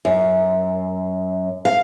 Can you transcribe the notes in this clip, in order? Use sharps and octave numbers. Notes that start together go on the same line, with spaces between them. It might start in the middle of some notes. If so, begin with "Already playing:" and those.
F#2
F5